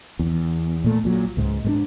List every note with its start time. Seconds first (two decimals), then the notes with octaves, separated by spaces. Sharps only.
0.19 E2
0.84 A#2 A3
1.04 A#1 A#2 F#3
1.37 C#2 G#2
1.64 G#2 A3 D4